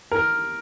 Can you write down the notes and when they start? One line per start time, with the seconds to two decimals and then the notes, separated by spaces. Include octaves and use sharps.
0.12 A#4